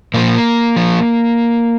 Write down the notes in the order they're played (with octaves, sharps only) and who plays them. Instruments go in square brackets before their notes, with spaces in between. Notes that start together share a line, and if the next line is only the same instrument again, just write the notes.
[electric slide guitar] A#2 F3 A#3
F3